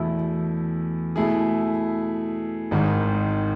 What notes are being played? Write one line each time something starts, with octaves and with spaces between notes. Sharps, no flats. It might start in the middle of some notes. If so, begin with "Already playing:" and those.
Already playing: E2 B2 A3 E4
B2 A3 E4 G#4
G#1 G#2 D#3